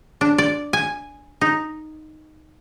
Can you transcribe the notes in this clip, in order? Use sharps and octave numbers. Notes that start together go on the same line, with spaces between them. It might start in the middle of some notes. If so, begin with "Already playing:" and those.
D4
D5
G#5
D#4